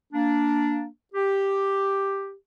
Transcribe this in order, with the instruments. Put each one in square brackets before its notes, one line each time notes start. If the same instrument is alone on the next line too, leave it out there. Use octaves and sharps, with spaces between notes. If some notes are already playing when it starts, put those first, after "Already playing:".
[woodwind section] A#3 D4
G4